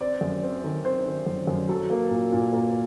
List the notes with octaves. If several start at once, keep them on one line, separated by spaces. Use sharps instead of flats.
C4 D5
F#2
C4
D#3
C4 C5
D#3
F#2
F#2
F#3 A4
A#3
A#2
A#2
A#3 A#4